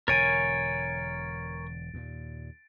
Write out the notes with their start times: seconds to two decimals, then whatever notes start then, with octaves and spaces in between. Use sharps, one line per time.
0.08 E1 D3 A#4 C#5 G#5 A6 D7
1.94 D#2 A#2